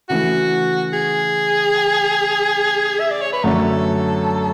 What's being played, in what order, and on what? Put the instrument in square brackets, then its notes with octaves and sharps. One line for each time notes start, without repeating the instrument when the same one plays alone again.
[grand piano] C#3 E3 A3 [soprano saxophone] F#4
[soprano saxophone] G#4
E5
D5
C#5
B4
[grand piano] F#2 D3 A3 C#4 [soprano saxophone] A4